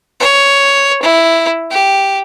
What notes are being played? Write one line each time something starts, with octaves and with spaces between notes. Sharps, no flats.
C#5
E4
G4